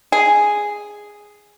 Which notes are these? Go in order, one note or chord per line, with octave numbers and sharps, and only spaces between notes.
G#4